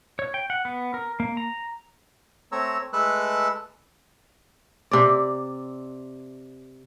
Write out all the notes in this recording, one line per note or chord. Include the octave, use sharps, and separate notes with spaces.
C#5
G5
F#5
B3
A#4
A#3
A#5
A3 C4 C#5 A#5 E6
G#3 A3 A4 B4 E6 F#6
C3 D5